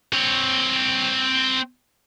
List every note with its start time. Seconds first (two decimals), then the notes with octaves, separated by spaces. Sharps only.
0.14 C4 C#5